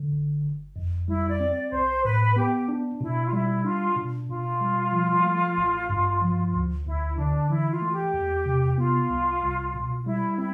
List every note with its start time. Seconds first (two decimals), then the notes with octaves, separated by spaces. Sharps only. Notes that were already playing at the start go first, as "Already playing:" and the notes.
Already playing: D3
0.12 G1
0.44 G1
0.76 F2
1.08 G3 E4
1.30 D5
1.40 C4
1.51 D5
1.72 B1 C5
2.04 A2 B4
2.36 B3 G4
2.69 D4
3.01 B2 E4
3.26 F4
3.33 G3 E4
3.65 D4 F4
3.96 B2
4.28 B2 F4
4.61 G3
4.93 F3
5.25 A3
5.58 A1
5.89 G2
6.21 F3
6.54 D2
6.86 D2 E4
7.17 D3 D4
7.50 E3 E4
7.70 F4
7.81 A3
7.92 G4
8.14 E2
8.46 C3
8.78 B3 F4
9.10 C2
9.43 C2
9.74 B2
10.06 G3 E4
10.38 C4 E4